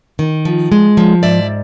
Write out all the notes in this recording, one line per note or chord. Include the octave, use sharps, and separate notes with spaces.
D#3
F3
G#3
F3
G#2 D5 E5